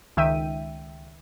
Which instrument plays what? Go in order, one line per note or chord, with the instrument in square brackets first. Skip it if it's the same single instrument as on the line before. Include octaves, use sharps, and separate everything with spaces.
[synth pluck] C#2 D#3 E5 G5 D#7